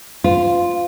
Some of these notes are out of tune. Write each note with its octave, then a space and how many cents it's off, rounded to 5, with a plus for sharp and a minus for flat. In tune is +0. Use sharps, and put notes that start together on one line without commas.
F4 +0 C5 -40